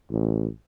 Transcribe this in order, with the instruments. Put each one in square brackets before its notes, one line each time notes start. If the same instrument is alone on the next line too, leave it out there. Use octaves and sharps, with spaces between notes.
[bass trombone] A1